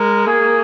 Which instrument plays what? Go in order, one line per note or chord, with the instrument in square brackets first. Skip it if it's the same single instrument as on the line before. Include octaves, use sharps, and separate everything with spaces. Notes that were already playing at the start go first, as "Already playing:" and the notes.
Already playing: [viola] G#3 [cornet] A#4
[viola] A#3 [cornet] G#4